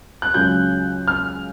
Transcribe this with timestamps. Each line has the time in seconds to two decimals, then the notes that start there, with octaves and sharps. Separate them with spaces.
0.22 F#6
0.34 C#2 C#3 F#3 G6
1.08 F6